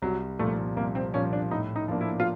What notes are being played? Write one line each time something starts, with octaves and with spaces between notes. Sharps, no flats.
C2 F#3
A#2 F3 A3
C2 A#3
C4
A#2 F3 C#4
D4
A2 D#4
D#4
F3 A#3 D4
E4
F4